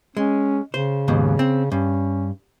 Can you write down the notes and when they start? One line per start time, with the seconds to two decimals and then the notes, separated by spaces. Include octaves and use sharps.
0.17 G#3 C#4
0.74 C#3 C5
1.08 D#2 G#2 B2
1.39 C4
1.72 G2 C#4